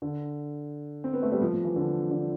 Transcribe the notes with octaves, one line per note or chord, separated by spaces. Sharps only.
D3
C4
B3
A3
G3
F3
F3
E3
D3
D3